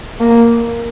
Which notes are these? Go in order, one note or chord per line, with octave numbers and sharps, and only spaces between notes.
A#3